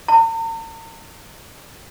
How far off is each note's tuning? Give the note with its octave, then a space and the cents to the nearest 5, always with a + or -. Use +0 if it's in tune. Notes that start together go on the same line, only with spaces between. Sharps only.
A#5 -45